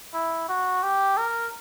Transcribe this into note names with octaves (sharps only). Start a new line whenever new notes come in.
E4
F#4
G4
A#4